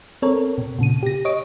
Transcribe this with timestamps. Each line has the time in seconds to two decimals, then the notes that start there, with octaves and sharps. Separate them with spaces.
0.22 C4 A4 A#4 C#5
0.58 B2
0.79 A#2 C#3 D#7
1.03 G4 A#6
1.25 C#5 D#5 D7